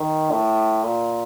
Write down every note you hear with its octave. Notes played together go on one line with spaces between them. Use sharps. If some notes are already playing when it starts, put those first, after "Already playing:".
Already playing: D#3
A2
A#2